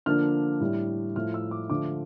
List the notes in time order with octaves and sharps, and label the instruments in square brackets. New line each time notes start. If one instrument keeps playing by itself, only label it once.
[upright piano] D3 F3 A#3 D4 F6
A2 G3 D4
A2 F3 A3 F6
E6
D6
D3 F3 A3 D4 D6